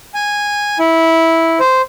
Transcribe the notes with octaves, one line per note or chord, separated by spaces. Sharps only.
G#5
E4
C5